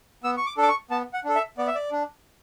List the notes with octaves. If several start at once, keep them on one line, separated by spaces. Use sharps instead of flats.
B3 E6
C#6
D6
D4 A4
D6
C#6
B3 A5
F#5
D4 A4
E5
B3 D5
E5
D5
D4